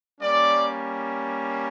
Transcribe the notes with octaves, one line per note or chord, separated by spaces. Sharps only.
G3 A#3 C#4 D5